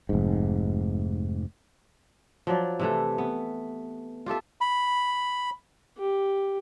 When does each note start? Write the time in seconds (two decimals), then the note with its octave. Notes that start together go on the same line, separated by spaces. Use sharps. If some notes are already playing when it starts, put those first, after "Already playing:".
0.09 F1 G#2
2.47 F3 F#3 D5
2.79 C3 E3 A3
3.18 B3
4.26 F4 G4 A4 E5
4.61 B5
5.98 G4